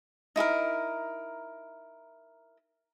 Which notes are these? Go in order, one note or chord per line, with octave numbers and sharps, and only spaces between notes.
D#4 E4 G#4 A#4